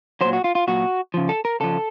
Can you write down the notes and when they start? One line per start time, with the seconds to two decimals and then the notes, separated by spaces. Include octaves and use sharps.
0.21 F#3 C5
0.25 A#2
0.33 F#4
0.44 F4
0.55 F4
0.67 A#2 F#3 F#4
1.14 C#3 F3
1.29 A4
1.45 A#4
1.60 C#3 F3 A4